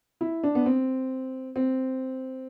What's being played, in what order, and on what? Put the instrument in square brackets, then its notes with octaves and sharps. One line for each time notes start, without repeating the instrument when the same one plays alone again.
[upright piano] E4
D4
B3
C4
C4